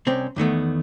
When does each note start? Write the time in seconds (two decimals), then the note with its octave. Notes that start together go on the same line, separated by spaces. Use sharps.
0.07 C2 C4 C#4
0.36 E2 D#3 A3 B3